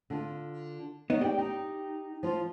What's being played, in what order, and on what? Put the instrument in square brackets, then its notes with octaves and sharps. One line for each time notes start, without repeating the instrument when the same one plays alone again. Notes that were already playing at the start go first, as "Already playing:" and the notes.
[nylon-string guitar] D3 F4
[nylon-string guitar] C#3 [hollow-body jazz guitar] B3 D#4
[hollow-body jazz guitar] G4 [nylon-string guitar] D5 G5
[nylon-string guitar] D#4
F3 F4